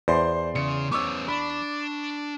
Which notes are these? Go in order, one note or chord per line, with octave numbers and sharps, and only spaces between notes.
E2 C5 D5 C6
C#3 C#7
B3 C#4 C#6 D6 E6
D4 B5